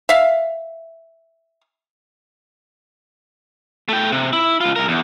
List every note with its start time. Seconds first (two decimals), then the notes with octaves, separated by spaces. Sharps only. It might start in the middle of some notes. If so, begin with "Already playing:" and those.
0.09 E5 F5
3.89 A3 G5
4.12 C3
4.33 E4
4.61 C#2 F4
4.76 C2 A#4
4.88 E2